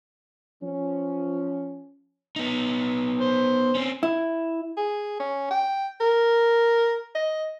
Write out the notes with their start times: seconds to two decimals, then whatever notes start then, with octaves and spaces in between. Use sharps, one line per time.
0.64 F3 C#4
2.36 B3 D#4
3.21 C5
3.75 C4 C#4
4.03 E4
4.77 G#4
5.20 C#4
5.51 G5
6.01 A#4
7.15 D#5